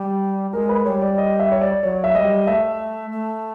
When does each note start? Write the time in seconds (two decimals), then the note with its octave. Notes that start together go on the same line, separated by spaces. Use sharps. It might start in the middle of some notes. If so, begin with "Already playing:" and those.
Already playing: G3
0.53 G#3 A#4
0.69 B4
0.85 G3 C#5
1.02 D5
1.18 D#5
1.39 E5
1.52 C#5
1.61 D5
1.83 F#3 C#5
2.04 E5
2.15 G#3 D#5
2.19 G3
2.47 A3 E5
3.12 A3